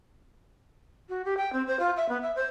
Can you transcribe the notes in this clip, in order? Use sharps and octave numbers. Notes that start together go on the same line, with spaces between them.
F#4
G4
G5
C4
C5
F4
E5
B3
E5
C5